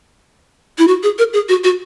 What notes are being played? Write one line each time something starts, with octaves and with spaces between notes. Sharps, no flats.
E4
F#4
G#4
A#4
G#4
F#4
F#4